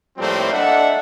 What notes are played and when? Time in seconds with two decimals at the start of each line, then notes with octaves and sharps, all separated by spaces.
0.17 A2 F3 G3 A3 A#3 C4
0.52 D4 A4 D#5 E5 F#5